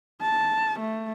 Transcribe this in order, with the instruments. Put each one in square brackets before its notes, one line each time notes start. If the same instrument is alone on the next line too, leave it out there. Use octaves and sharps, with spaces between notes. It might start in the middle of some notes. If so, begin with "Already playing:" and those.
[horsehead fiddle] A5
A3